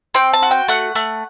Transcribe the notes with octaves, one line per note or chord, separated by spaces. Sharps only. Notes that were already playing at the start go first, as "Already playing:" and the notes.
C4 G5
A5
F#4
G5
A3 F#5
A3